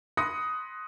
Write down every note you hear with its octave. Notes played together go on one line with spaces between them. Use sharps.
B5 C6 D#6 F#6 A#6 C#7